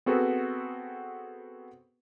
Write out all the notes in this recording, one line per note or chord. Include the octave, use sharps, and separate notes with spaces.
B3 C4 F#4 G#4 A4 B4